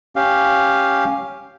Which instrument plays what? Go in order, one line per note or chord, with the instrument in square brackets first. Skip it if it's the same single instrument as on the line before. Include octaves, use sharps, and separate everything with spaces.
[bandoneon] C#4 G4 F5